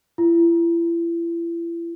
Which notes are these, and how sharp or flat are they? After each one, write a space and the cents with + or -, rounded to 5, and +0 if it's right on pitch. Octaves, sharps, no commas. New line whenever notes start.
E4 +40